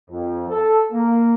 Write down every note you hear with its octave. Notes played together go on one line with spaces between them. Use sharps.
F2
A4
A#3